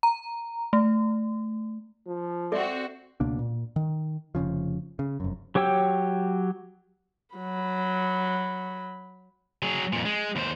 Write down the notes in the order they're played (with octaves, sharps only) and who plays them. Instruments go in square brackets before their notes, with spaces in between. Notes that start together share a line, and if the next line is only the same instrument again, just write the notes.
[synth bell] A#5
A3
[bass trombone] F3
[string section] C4 F#4 [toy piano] A4 D5 E5
[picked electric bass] C#2 B2 A#3 D4
A#2
D#3
F1 C2 C#3 F3
C#3
F1 F#2
[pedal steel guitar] F#3 G4 C#5 G5 E6
[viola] F#3 B5
[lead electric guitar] F#3 G#4
F2 A#2
G#3
D#2 C5